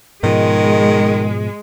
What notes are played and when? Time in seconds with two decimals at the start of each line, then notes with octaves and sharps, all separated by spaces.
0.23 G#2 B2 D#3 F3 G#3